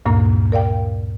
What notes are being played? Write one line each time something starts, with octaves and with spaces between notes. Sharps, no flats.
D2 G2 A#2 A#3
A#4 D5 F5 G5